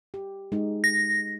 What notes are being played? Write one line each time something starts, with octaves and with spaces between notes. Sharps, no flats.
G4
G#3 D#4
A#6